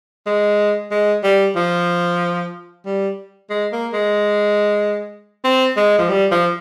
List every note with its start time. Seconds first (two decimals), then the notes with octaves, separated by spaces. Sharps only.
0.26 G#3
0.91 G#3
1.23 G3
1.56 F3
2.85 G3
3.50 G#3
3.72 A#3
3.93 G#3
5.44 C4
5.77 G#3
5.99 F3
6.09 G3
6.31 F3